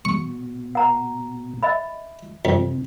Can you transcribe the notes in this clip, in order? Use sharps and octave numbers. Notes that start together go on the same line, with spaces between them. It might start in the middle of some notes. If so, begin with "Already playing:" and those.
B2 C#6
F#5 A#5
D#5 E5 B5
F2 C3